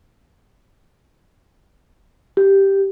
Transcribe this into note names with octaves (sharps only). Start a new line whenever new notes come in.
G4